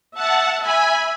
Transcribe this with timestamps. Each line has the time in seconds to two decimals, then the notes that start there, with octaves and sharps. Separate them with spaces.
0.15 E5 F#5 A5
0.62 E5 G#5 B5